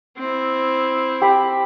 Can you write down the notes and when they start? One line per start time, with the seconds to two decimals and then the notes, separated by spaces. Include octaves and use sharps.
0.18 C4 E4
1.22 G4 B5